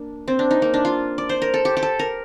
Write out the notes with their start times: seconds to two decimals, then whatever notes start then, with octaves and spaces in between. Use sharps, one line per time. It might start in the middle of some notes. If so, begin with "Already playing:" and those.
Already playing: A#3 D4
0.28 C4
0.39 D4
0.51 D#4
0.62 A#3
0.74 D4
0.85 F4
1.18 D5
1.29 C5
1.42 A#4
1.54 A4
1.65 G4
1.77 G4
1.83 A4
1.99 A#4